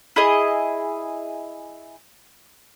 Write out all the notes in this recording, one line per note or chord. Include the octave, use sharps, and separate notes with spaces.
E4 G#4 D#5